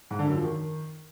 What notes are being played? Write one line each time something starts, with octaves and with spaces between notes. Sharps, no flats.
G#2
D3
F#2
F3
D#3